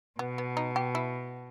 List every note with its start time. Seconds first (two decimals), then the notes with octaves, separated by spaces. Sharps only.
0.19 B2 B3
0.38 B3
0.57 D#4
0.76 G4
0.95 E4